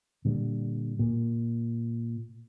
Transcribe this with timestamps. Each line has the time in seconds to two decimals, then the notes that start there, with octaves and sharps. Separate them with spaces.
0.25 A#2 D3 G3
0.99 A#2